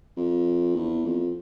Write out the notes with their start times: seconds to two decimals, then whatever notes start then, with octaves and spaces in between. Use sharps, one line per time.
0.17 F2
0.75 E2
1.05 F2